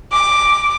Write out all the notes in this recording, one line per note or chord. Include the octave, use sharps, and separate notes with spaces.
D6